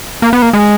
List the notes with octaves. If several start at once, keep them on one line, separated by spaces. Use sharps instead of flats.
A#3
B3
A#3
G#3